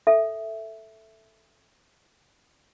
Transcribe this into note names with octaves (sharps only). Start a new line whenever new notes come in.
A4 E5